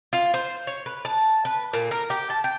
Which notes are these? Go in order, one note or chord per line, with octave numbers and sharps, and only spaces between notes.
F4
C5
C#5
B4
A5
B4
A#2
A#4
G4
A5
G5